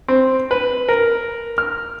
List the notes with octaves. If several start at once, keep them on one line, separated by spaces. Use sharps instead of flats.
C4
B4
A#4
F6